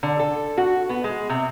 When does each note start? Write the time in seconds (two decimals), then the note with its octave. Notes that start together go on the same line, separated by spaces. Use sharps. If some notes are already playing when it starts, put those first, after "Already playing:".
0.03 D3
0.19 A4
0.58 F#4
0.89 B3
1.04 G#3
1.29 C3